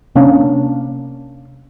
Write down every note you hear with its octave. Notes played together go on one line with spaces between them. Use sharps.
C3 A#3 C#4 D4